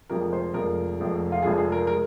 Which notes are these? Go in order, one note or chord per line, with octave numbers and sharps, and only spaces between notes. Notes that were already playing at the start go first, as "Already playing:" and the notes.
F1 F2 F3 G#3 A#4
C5
F1 F2 F3 G#3 A#4
F1 F2 F3 G#3
F4
F1 F2 F3 G#3 G#4
G#4
A#4
G#3 A#4